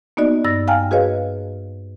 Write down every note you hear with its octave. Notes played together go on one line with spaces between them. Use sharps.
A#3 B3 D#4 F#4 D5 D#5
G2 E6 A6 A#6
F5 G5 G#5 A#5 F6
F#4 G#4 B4 C#5 D#5 F5